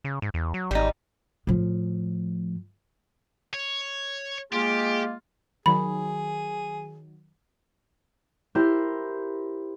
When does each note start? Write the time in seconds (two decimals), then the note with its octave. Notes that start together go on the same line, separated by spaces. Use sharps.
0.04 C#3
0.22 G#2
0.34 E2
0.54 F#3
0.71 G#1 G3 D#4
1.47 A2 F3
3.54 C#5
4.52 G#3 A#3 F4 G4 G#4
5.66 D#3 F#3 G#4 B5
8.55 E4 G4 A#4 C5